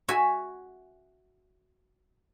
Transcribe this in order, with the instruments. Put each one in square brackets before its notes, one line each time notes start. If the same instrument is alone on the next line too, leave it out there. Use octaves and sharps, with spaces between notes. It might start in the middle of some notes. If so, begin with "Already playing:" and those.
[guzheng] F#4 E5 G#5